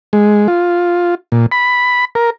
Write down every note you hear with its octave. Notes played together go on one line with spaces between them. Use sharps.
G#3
F4
A#2
B5
A#4